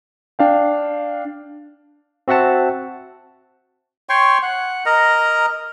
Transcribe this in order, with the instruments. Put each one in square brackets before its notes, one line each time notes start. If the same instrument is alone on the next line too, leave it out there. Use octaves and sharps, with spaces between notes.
[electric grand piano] D4 F5 G5
[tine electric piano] C4 F#4 E5 F#5 A5
[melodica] C#5 G5 C6 C#6
F#5
A#4 D#5 A#5